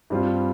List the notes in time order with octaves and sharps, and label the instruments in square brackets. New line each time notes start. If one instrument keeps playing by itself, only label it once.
[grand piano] G2 G3 C4 F4